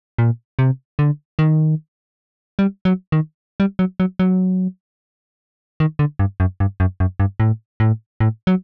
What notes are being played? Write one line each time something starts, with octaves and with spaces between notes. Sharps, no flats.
A#2
C3
D3
D#3
G3
F#3
D#3
G3
F#3
F#3
F#3
D#3
D3
G2
F#2
G2
F#2
F#2
G2
A2
A2
A2
F#3